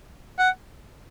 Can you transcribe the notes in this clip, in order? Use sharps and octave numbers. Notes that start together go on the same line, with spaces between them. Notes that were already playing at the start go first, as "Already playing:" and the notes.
F#5